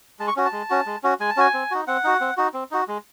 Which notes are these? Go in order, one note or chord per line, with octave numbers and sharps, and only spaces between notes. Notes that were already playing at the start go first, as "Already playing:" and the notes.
G#3 A5
C#6
C#4 F#4
A5
G#3
C#4 F#4
G#3
C#4 F#4
G#3 G#5
A5
C#4 F#4 G#5
C4
D#4 F#4
C4 F#5
D#4 F#4
C4
D#4 F#4
C4
D#4 F#4
G#3